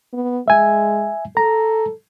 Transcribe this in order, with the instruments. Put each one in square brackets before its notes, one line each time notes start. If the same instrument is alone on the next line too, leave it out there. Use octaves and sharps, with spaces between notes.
[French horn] B3
[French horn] G#3 [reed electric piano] E5 G#5
[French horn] A4 [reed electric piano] A#5